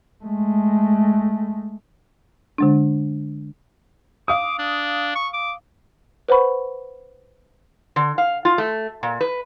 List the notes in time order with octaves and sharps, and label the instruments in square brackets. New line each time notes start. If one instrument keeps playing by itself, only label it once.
[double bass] G#3 A3
[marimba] D3 G#3 D4
[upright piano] F5 D#6 [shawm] D6
[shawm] D4
C#6
D6
[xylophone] B4 C5 F#5 B5 C#6
[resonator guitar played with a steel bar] D3
F5
F4
A3
A#2
B4